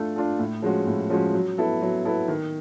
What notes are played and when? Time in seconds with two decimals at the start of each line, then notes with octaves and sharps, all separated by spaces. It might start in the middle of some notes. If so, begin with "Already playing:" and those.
Already playing: A3 D4 F4 A4
0.16 D4 F4 A4
0.39 A2
0.62 F3 G#3 C#4 F#4
0.87 A2
1.10 F3 G#3 C#4 F#4
1.33 F#3
1.58 B3 E4 A4
1.81 F#3
2.05 B3 E4 A4
2.28 D#3